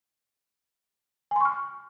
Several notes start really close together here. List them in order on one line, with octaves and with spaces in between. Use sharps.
G#5 C6 C#6 F6